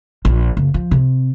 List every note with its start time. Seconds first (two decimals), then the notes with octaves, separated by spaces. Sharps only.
0.25 A#1
0.57 F#1
0.74 F3
0.91 C3